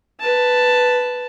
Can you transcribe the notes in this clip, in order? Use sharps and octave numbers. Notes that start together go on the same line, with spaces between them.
B4 A5